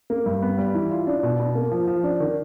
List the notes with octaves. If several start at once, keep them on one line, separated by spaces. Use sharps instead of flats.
A#3
G2
B3
G3
E3
F4
D4
B2
B2
A#3
F3
F3
D4
D#3